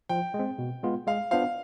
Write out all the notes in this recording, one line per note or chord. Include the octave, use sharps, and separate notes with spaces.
F3 G5
G#3
C4
B2
G#3 B3 F4
G#3 F5
B3 D4 F4 C5 F5